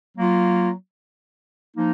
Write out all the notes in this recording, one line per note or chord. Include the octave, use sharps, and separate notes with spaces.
F#3 A#3 F4
F3 A#3 D#4